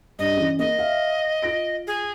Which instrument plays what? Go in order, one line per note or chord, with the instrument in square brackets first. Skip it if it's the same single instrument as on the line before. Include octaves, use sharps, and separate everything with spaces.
[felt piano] G2 [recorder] D#5
[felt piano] C#3 E3
[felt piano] A#3 [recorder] D#5
[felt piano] E5 F5
F4 A#6 D7
[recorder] G#4